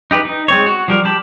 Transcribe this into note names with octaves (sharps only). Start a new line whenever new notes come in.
D#4 G4 B4
D#4
G#3 C4 C#5
F#4
F3 G3 A#4
G4 A5 B5